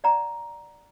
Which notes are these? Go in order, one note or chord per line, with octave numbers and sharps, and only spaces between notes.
D5 F#5 A#5